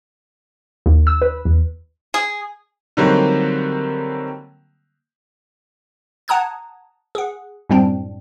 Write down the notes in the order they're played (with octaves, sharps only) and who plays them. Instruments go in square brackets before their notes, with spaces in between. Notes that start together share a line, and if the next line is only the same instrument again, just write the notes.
[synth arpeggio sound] D#2
E6
B4
E2
[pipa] G#4
[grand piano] D3 D#3 F#3 G3 A#3 C4
[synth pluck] F#5 A5 A#5 D#6 F#6 G#6
G#4 F#5
F#2 A2 G3 C4 D4